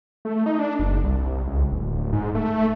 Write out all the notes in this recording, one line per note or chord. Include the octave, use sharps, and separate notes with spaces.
A3
D#4
D4
F#1
C2
C#2
D1
G#2
A3